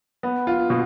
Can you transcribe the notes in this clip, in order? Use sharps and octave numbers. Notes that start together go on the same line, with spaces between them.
B3
F4
B2